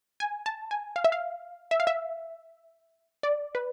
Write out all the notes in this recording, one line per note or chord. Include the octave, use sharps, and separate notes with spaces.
G#5
A5
G#5
F5
E5
F5
E5
F5
E5
D5
B4